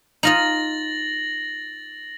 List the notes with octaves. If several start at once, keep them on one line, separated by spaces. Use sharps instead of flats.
D#4 F4 D#5 A6 A#6 F#7